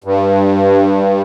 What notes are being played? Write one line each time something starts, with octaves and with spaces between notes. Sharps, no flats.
G2